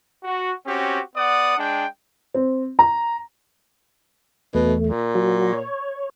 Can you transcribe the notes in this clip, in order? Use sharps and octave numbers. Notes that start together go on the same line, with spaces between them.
F#4
C4 C#4 F#4 G4
B3 D5 F#5 D#6
G#3 D4 G5
C4
A#5
E2 B2 A3
A#2
F#3 F#4
C#5